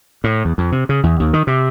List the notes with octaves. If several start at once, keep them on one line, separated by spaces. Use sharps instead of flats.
A2
E2
F2
C3
C#3
E2
D#2
D#3
C3